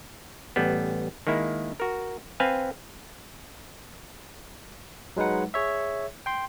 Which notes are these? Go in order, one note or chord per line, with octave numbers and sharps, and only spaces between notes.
A1 G3 B3
D#3 G#3 A#3 E4
F#4 A#4
C4 B4 F5 G#5
F#3 G#3 D#4 B4 F#5
G#4 C#5 E5
G5 C6